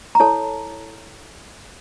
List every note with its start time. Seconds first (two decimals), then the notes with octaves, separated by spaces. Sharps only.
0.15 A#5
0.20 E4 A4 C#5 A5